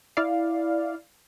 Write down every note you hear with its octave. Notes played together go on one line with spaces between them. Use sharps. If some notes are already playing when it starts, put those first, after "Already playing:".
E4 D5 F5